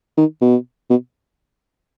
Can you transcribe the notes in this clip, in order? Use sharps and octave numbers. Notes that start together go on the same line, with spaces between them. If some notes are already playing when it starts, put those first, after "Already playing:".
D#3
B2
B2